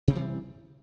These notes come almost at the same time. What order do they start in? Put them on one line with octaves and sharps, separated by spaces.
C3 C4 G3 E3